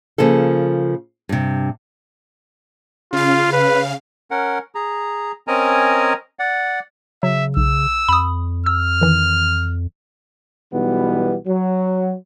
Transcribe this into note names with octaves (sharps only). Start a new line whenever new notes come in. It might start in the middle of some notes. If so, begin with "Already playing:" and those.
C#3 F3 A#3 A4
G2 C3
C#3 F4 F5
B4
C#4 A#4 F#5
G#4 A#5
C4 C#4 A#4 D#5 G#5 A#5
D5 F#5
C#3 F#3 E5
B1 E6
F2 B5 D#6
E6 F6
D#3 E3
B1 B2 E3 G3 B3
F#3